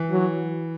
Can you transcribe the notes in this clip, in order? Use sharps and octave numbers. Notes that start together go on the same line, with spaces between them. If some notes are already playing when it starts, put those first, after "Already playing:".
Already playing: E3
F#3